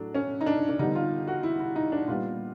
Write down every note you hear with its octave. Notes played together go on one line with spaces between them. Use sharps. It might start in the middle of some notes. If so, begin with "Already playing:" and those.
Already playing: A2 F#3 A3 D4
C#4
D#4
D4
D4
D3 G3 B3 D#4
F4
F#4
E4
E4
D#4
D4
A#2 G3 B3 F4